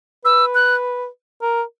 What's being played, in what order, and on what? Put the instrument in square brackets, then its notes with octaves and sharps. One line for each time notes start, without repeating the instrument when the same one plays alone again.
[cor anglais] B4 [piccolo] E6
[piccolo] F#6
[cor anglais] A#4